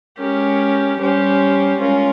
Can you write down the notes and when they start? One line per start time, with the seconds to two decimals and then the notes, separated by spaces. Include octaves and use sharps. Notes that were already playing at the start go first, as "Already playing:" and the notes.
0.18 G#3 C#4 G4 A#4
0.99 G3 C#4 G4 C5
1.79 G#3 C#4 F4 A#4